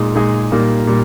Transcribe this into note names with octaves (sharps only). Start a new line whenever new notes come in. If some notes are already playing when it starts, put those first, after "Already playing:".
Already playing: A#2 G#3 D#4 G#4
A#2 G#3 D#4 G#4
A#2 G3 A#3 D#4
A#2 G3